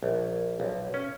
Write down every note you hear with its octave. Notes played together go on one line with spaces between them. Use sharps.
A#1
B1
C#4